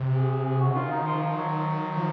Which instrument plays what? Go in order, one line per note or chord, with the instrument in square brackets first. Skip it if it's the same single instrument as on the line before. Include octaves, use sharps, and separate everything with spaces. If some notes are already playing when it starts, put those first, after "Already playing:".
Already playing: [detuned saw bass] C3
[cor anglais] G#4
G#4
G#4
F#4
[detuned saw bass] C#3
[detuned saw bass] D#3 [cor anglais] F4
[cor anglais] D#4
F3
F3
F#3
[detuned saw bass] F3